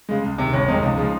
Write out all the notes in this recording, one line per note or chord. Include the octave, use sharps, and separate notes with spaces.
C#3 G#3
C#2
C3 D#3
G1 C#4
F2 C3 D#3 G#3 D#4
C#2
C#3 F3 G#3